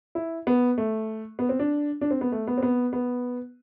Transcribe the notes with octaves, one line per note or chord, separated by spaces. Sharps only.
E4
B3
A3
B3
C4
D4
D4
C4
B3
A3
B3
C4
B3
B3